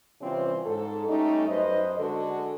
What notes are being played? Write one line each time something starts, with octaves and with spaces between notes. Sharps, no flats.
C3 E3 G3 C4 C#4 F4
G#2 A4
G3 A3 C#4 D#4
F#2 B4 C5 D#5
D3 G#3 F#4 A4